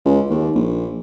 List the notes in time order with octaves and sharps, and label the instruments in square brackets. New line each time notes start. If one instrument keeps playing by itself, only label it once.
[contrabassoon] C#2
D#2
A#1